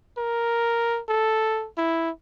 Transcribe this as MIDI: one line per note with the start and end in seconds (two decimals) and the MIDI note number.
0.18 1.00 70
1.09 1.67 69
1.78 2.10 64